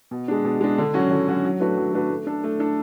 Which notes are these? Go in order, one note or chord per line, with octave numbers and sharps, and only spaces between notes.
B2
G#3 D4
B2
G#3 D4
D3
F#3 C#4 F#4
D3
F#3 C#4 F#4
F#3
A3 D4 F#4 B4
F#3
A3 D4 F#4 B4
A3
D4 A4
A3
D4 A4